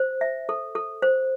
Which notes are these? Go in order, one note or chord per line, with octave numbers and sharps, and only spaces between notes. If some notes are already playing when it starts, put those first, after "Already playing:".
Already playing: C5
E5
A4
A4
C5